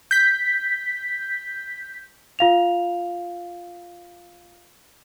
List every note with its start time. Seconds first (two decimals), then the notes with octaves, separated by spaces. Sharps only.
0.11 G6 B6
2.39 F4 F5 F7